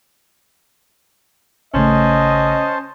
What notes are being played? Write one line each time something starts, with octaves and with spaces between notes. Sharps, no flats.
A1 C#3 A3 C#4 C5 D#5 A5